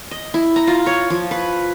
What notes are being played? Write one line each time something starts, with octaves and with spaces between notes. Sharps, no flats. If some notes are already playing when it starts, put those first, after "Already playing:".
D#5
E4
A#5
F4
C#5
F3
B4